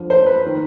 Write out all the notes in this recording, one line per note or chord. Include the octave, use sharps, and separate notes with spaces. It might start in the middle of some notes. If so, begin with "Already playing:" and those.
Already playing: F2 D3 F3
C5
B4
D#3